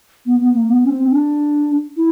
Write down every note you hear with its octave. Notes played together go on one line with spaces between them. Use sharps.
B3
B3
A#3
B3
C#4
C4
D4
E4